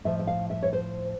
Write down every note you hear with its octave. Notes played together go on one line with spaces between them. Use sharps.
A2 F3 E5
E5
F5
E5
C#5
C5